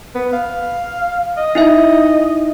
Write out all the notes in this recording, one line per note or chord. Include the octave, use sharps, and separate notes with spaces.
B3
F5
D#5
D#4 E4 E5